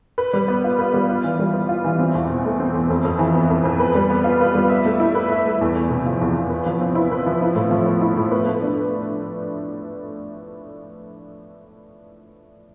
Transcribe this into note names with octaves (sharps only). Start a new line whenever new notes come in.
B4
G3
B3
F4
B4
G3
F4
E3
G3
B3
F4
E3
C4
E2
B2
A3
C4
E2
F2
F2
E3
B3
F2
F2
B4
G3
B3
F4
B4
G3
E5
A3
E4
B4
E5
A3
E2
E2
C3
F3
E2
E2
B4
F3
C4
E4
B4
F3
E4
A2
F3
B3
E4
A2
B4
A3
D4